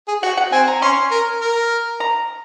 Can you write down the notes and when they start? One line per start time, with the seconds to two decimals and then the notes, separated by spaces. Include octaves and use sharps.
0.08 G#4
0.23 F#4 F#5
0.37 F#5
0.52 C4 G#5
0.68 A#5
0.82 C#4 C6
1.11 A#4
1.41 A#4
2.00 A#5